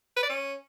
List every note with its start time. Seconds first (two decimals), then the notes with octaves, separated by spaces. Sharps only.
0.16 B4
0.23 D5
0.29 C#4